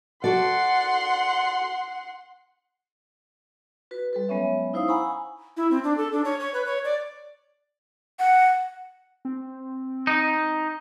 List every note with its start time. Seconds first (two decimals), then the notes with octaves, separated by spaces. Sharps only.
0.24 F#4 A4 D5 F#5 C6
3.91 F#4 B4
4.13 G3 A4 B4
4.29 F#3 G#3 B3 C#4 C#5 E5
4.73 D#4 E4 C5 F5 D#6
4.88 F#5 G#5 A#5 B5 C#6 E6
5.57 E4
5.71 C4
5.84 D4
5.97 A4
6.13 D4
6.25 C#5
6.40 C#5
6.54 B4
6.66 C#5
6.84 D5
8.19 F#5
9.25 C4
10.07 D#4